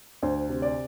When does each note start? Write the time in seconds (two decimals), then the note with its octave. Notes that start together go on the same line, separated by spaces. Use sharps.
0.23 D2 C5
0.49 C3
0.62 D5